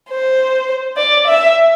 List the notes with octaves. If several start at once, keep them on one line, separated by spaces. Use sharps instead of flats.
C5
D5
E5